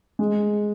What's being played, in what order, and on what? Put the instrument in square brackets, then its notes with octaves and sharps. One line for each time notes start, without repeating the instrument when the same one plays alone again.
[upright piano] G#3